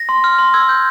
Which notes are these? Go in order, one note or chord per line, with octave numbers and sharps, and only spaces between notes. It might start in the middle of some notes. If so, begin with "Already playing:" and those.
Already playing: A#6
C6
F6
C6
E6 G#6
G6